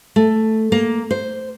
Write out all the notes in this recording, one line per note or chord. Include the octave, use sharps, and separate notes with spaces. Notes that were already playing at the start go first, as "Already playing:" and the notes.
A3
A#3
C5